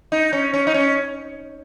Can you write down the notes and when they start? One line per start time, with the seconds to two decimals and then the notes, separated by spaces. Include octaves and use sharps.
0.12 D#4
0.33 C#4
0.54 C#4
0.67 D#4
0.74 C#4